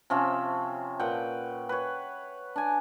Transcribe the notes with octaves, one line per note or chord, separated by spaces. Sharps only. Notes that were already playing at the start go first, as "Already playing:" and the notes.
C3 F3 C#4 E5
A#2 B4 F#5 G5
B4 C#5
D4 G#5